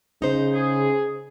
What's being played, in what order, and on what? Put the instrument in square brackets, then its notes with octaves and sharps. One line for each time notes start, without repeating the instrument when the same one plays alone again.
[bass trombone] C#3 [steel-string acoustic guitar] D#4 C5
[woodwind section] G#4